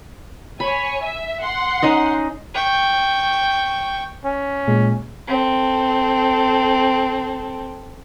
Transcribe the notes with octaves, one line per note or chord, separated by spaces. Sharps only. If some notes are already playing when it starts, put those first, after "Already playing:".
C#5 G#5 B5
E5
F#5 C6
C#4 D#4 D#5
G5 C#6
C#4
A#2 G#3
C4 A4